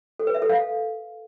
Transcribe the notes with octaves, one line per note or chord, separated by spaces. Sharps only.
A4
B4
E5
A4
F5